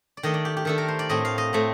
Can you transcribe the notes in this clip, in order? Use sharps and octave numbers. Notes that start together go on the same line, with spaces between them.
D5
D#3 A3 D4 D#5
D5
G4
G4
D#3 A3 D4 A4
A#4
C5
D5
A2 A3 C4 D#5
F5
D#5
A2 A3 C4